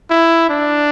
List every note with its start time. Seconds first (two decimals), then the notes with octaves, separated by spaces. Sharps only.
0.10 E4
0.49 D4